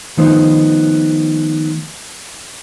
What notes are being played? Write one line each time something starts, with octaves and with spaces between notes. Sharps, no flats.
D#3 F3 A3 B3 D#4 C5